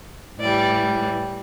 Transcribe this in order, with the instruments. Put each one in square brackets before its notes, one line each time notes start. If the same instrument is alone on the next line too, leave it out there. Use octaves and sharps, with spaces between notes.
[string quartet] A2 E3 G3 D5